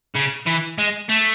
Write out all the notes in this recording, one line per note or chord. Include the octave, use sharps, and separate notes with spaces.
C#3
E3
G#3
A3